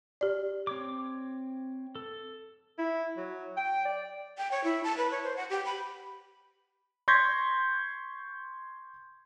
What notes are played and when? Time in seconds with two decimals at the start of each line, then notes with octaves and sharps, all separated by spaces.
0.21 G4 D5
0.67 C4 C#5 D6
1.95 A4
2.78 E4
3.17 F#3
3.57 G5
3.85 D5
4.38 G5
4.51 C#5
4.64 E4
4.84 A5
4.97 B4
5.11 C#5
5.24 C5
5.37 F#5
5.50 G4
5.65 B5
7.08 C6 C#6 G6 G#6 A#6 B6